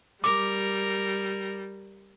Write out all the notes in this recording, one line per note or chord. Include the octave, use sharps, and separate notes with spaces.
G3 A#4 D6